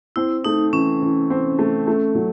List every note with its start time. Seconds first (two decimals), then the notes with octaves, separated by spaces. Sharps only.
0.16 C4 E4
0.45 A3 D#4
0.73 E3 C#4
1.02 E3
1.30 C4
1.59 A3
1.87 A3
2.15 F#3